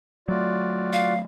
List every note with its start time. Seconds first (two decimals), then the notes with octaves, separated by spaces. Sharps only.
0.28 F#3 A3 F4 F#4 D5
0.93 F5